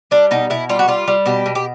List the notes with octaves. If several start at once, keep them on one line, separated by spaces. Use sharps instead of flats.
G3 D4
B2 D#4
B2 E4
G3 F4
F#4
G3 F4
G3
B2 G4
B2
G4